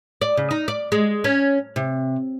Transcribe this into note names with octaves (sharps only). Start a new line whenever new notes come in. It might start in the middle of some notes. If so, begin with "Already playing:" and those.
D5
C#3
D#4
D5
G#3
C#4
C3